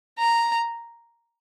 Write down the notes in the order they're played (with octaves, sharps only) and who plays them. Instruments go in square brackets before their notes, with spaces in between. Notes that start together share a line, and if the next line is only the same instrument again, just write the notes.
[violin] A#5